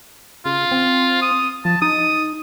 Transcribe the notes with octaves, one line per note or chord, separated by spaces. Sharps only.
C#3 F4
C4
D#6
F3 A5
D#4 D#6